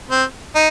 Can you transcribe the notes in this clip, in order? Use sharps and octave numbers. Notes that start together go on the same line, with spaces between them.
C4
D#4